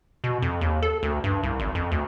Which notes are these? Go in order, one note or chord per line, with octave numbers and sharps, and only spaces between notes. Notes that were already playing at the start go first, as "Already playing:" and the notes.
B2
F2
D#2
A4
D2
G2
C2
G#1
F2
D2